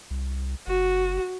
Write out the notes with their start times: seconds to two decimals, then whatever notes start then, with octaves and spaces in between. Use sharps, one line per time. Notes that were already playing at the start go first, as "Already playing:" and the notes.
0.11 C2
0.67 F#1 F#4